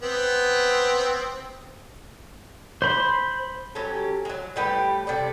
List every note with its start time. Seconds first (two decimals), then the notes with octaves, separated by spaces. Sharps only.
0.02 B3 C4
2.82 C5 B5 C6
3.75 F#3 C#4 G4 A4
4.25 F#3 G#3
4.56 A2 G3 G4 B4
5.07 C3 A4 D5